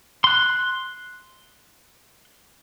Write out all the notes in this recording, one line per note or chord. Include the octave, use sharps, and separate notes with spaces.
C6 F#6